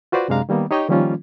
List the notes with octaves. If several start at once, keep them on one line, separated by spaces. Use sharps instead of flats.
F4 F#4 B4 C5 D5
F#2 C3 G#3 D4 F5 A#5
D#3 G3 A#3 B3
D#4 G4 C#5 D#5 G5 C#6
D#3 F3 G3 A#3 C#4 F4